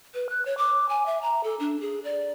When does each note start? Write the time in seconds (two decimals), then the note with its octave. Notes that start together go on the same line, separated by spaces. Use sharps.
0.14 B4
0.30 F#6
0.45 C#5
0.58 D6
0.89 G#5
1.06 E5
1.22 A#5
1.44 A4
1.60 D4
1.81 G#4
2.04 D5